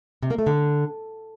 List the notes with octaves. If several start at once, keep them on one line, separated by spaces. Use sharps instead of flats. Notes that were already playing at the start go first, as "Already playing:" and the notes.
C3
A#3
A3
D3